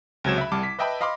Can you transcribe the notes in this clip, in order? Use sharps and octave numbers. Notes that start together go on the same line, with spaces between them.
C#2 C3 F#3 G#6 E7
E5 B5
C2 G3 A5 D6
B6
B4 D#5 E5 G5 A5 B5
D#5 F5 B5 C6 D6